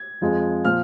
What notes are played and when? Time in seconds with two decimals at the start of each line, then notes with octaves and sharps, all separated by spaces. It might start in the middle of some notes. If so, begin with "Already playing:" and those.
Already playing: G#6
0.21 F2 F3 G#3
0.64 A#2 F3 F6